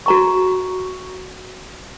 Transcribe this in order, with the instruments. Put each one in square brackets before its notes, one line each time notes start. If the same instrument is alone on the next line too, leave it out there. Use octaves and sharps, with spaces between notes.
[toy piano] F#4 A#5 C#6